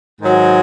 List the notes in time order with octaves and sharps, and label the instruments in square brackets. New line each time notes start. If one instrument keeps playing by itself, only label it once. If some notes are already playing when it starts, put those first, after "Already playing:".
[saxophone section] G#2 D#3 F#3